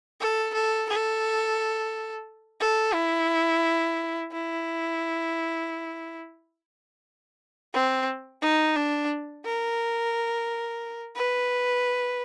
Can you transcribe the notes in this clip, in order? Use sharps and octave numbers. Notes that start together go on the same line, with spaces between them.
A4
A4
A4
A4
E4
E4
C4
D#4
D4
A#4
B4